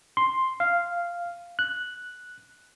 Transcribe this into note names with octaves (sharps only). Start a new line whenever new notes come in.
C6
F5
F#6